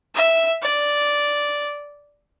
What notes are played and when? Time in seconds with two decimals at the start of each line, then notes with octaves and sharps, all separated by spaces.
0.15 E5
0.62 D5